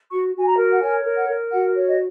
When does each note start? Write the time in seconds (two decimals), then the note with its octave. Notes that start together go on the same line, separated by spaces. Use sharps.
0.11 F#4 C#6
0.34 F#4
0.40 G#5
0.46 A#5
0.58 A#4
0.73 F#5
0.81 C#5 G#5
1.05 A#4
1.17 F#5
1.28 A#4
1.52 F#4 F#5
1.76 C#5
1.87 D#5